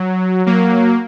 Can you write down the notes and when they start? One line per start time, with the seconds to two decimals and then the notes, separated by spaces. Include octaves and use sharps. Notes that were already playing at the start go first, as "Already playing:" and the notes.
Already playing: F#3
0.46 F#3 A#3